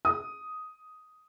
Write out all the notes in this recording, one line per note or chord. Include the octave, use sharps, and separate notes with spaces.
D#6